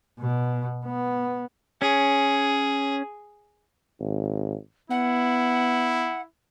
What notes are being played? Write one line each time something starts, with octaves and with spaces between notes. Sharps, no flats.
B2
B3
C#4 G#4
G#1
B3 E4 F#5